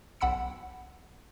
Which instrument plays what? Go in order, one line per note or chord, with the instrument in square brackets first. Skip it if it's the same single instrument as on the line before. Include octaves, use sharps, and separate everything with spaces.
[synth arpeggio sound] B1 F#5 B5 E6 C#7